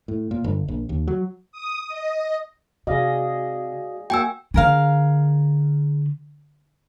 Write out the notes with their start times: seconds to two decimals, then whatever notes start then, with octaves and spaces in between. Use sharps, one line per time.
0.08 A2
0.31 A#2
0.44 G1
0.68 A#1
0.89 D#2
1.07 F#3
1.52 D#6
1.89 D#5
2.87 C3 F#4 G#4 D5 D#5 F5
4.10 A#3 F#4 G5 G#5 E6
4.54 D3 G#4 A#4 F5